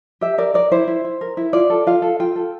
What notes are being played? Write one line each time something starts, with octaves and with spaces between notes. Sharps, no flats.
G4 E5
A#4 D5
A#4 D5
E4 C5
E4
E4
A#4
E4
F4 D5
A4
F4 F5
A4
F4 G5
A4